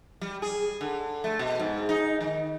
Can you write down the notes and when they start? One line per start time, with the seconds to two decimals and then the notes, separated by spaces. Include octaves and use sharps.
0.21 G3
0.42 G#4
0.81 D3
1.24 A3
1.39 B2
1.59 G#2
1.89 D#4
2.21 D#3